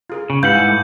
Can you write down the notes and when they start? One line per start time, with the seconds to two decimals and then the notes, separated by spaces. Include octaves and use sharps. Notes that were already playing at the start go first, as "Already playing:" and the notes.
0.10 F4 G#4 A#4
0.30 C#3
0.43 G#2 E4 G4 B4 F5 F#5 G6
0.55 G3 G#5
0.68 A3